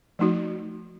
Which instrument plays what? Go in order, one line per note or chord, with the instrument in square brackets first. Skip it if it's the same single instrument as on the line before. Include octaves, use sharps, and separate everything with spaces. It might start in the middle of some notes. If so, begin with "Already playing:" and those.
[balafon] F3 A3 D#4 F#4